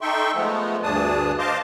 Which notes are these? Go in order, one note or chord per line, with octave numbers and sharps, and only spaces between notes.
D#4 A4 E5 G5 C6 C#6
F3 G#3 A3 B3
D2 G2 D4 G#4 A5 D#6
C5 D#5 F5 A5 C6 D6